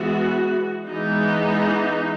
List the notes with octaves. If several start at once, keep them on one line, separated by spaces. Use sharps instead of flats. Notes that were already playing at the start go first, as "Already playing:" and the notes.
Already playing: E3 G#3 B3 F#4
E3 G#3 B3 D#4